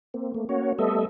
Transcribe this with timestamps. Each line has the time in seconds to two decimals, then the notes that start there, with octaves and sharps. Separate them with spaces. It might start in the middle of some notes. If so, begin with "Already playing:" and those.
0.14 A#3 C4
0.34 A3 A#3
0.49 A#3 C#4 F#4 C#5
0.79 G3 A3 B3 A4 D#5 E5